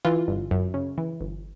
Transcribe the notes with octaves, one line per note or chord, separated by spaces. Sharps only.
E3 F4
G1
F#2
C#3
E3
G1